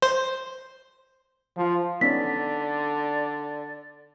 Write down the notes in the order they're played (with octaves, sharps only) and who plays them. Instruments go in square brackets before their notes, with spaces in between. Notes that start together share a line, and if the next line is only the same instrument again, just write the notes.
[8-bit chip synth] C5
[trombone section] F3
[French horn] D3 [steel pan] B3 C#4 D#4 [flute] D5 [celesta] B6